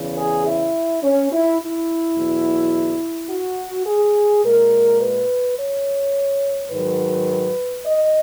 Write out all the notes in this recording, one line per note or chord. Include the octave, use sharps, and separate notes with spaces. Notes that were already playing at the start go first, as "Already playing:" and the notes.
Already playing: E2 C#3 E3
G#4
E4
C#4
E4
E4
E2 B2 F#3
F#4
G#4
A#2 G#3 A#4
B4
C#5
G#2 D#3 F#3 B4
D#5